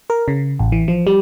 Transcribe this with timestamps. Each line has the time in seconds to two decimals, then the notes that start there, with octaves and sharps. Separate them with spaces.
0.10 A#4
0.28 C#3
0.59 A1
0.72 E3
0.88 F3
1.07 G3